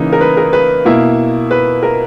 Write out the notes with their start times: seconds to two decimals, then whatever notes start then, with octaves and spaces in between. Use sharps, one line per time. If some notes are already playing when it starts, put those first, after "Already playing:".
Already playing: C#3 E3 A#3 D#4
0.13 A#4
0.21 B4
0.37 A#4
0.53 B4
0.85 B2 A#3 E4
1.51 B4
1.83 A#4